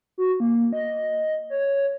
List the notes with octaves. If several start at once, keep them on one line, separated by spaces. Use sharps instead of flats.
F#4
A#3
D#5
C#5